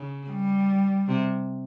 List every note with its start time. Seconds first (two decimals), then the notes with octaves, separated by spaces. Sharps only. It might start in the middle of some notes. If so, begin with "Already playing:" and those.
Already playing: C#3
0.30 G3
1.08 C3